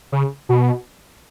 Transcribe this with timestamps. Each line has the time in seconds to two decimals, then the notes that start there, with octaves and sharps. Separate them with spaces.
0.12 C#3
0.49 B2